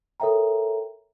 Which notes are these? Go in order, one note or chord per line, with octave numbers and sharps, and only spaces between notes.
A4 A#4 C#5 E5 G5 A#5